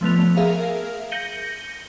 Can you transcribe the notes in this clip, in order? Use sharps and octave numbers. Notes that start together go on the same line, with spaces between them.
F3 A3 B3 F7
G#4 A#4 E5 F5
G6 A#6 C#7 D#7 F#7 G7